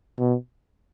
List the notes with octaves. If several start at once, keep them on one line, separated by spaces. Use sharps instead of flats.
B2